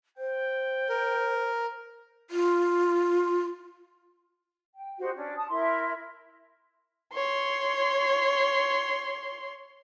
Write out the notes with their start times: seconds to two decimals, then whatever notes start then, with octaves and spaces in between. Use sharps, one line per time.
0.18 C5 G5
0.89 A#4
2.30 F4
4.76 G5
4.99 D#4 F#4 G4 C5
5.15 C#4 D4
5.36 A5 D#6
5.50 E4 A#4 E5 C6
7.15 C#5 C6